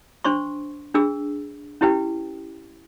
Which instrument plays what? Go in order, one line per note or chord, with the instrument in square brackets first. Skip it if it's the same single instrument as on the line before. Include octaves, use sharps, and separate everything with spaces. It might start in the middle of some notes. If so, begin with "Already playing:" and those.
[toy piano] D4 C5 C6 C#6
D4 G#4 E6
C#4 E4 G4 B4 G5